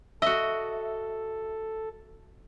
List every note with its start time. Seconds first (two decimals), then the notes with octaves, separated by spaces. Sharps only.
0.22 F#4 A4 D#5 E5